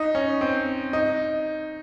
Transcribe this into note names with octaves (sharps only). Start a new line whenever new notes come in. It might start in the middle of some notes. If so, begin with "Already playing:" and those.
Already playing: D#4
C#4
C4
D#4